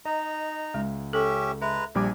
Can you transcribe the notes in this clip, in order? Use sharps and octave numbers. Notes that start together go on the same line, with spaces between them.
D#4 D#5 A#5
C#2 G#3
C#4 G4 A4 E5
G#3 B4 E5 A#5
A#1 G3 G#5 D6